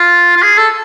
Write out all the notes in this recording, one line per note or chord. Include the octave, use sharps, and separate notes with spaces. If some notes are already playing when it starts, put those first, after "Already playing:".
Already playing: F4
F4
G#4
A4